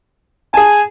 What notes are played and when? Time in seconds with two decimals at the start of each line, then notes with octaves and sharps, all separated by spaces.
0.54 G#4 G#5 A5